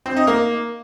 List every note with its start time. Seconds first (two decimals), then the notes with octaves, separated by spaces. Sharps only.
0.06 C4
0.16 D#4
0.27 A#3